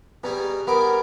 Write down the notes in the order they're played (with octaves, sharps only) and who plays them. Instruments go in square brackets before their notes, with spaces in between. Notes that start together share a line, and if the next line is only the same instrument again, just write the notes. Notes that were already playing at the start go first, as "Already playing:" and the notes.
[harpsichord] B2 G3 G#4 [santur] A#5
[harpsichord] G3 G#4 D6 [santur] B3 [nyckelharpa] A#4